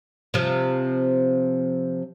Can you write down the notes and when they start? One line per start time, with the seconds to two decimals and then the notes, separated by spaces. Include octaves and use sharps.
0.34 C3 F3